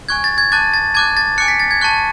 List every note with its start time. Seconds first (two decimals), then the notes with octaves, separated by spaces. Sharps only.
0.09 G#5 C#6 F#6 G#6
0.24 A6
0.38 G#6
0.52 A5 D6 F#6 A6
0.74 A6
0.94 A5 D6 F#6 G#6
1.17 A6
1.38 G#5 D6 F#6 C#7
1.48 B6
1.60 A6
1.71 G#6
1.81 A5 C#6 F#6